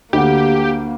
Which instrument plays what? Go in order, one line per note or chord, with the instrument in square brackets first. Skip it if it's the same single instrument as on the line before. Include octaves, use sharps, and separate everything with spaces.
[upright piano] D2 F#5 [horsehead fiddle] A#3 [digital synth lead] G4